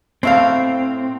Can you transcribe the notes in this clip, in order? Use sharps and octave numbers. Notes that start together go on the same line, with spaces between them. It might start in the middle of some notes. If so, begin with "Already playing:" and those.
A2 C4 E5 F5